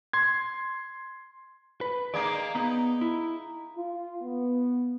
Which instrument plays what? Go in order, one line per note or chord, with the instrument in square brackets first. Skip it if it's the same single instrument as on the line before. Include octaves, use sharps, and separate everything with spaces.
[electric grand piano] C6 G#6
[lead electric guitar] B4
[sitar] G#3 A#3 D#4 [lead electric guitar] D5 F5
[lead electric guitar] B3 [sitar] D#4
[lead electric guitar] E4
[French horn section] F4
B3